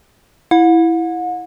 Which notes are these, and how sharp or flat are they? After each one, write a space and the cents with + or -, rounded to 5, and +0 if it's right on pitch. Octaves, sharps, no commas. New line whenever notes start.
E4 +0 F#5 -40